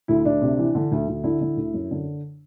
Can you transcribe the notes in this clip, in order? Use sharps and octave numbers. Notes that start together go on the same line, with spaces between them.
D2 E4
D2 D4
C3
E3
D3
D2
D2
D3 E4
D3
D2
F#2
D3